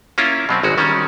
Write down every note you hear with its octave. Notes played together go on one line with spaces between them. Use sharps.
A#3 C#4 E4 F4
B2 F#3 C4
G#1 G#3 F#4
D#3 G3 C#4